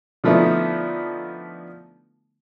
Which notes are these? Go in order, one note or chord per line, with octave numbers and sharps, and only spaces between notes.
D3 F3 A3 B3 D#4 E4